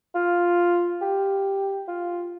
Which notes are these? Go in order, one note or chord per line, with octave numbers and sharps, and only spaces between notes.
F4
G4
F4